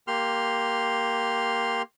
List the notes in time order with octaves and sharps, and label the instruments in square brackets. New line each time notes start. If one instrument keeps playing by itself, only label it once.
[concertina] A#3 G4 C6 F6